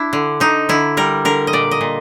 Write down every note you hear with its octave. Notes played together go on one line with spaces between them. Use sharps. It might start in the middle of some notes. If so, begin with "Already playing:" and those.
Already playing: D4 E4
D3
D3 D#4
D3 E4
G3 A#4
D3 A#4
D#5
A#2 D5
D#5
A#2